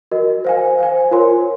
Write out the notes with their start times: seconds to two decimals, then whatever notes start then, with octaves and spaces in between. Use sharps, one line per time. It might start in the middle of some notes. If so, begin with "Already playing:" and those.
0.11 F#4 A#4 D#5
0.45 C5 F5 G#5
0.79 C5 F5 G#5
1.11 F4 A#4 C#5 G#5 C6